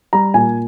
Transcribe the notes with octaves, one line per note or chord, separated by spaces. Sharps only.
G3 A#5
A#2 G#5